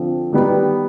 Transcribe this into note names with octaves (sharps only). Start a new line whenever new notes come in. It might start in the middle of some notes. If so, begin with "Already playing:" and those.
Already playing: D3 F3 C4
D#3 G3 B3 D#4